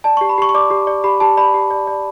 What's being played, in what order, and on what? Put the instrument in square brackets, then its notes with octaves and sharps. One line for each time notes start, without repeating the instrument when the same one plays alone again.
[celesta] D5 A5
G4 C#6
B5
G4 C#6
C#6
D5 D6
G4
D5
G4 B5
G4 A5
D5 B5
G4
D5
D5